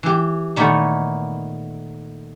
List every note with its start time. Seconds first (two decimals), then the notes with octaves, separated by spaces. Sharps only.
0.03 E3 G4
0.56 A#2 D#3 A3 B3 C#5 G#5